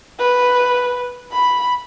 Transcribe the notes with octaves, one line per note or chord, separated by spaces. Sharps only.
B4
B5